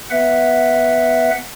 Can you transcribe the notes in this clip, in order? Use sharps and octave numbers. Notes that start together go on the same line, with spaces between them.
B3 B4 E5 F#5